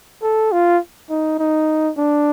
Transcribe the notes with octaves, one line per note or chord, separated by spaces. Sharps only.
A4
F4
D#4
D#4
D4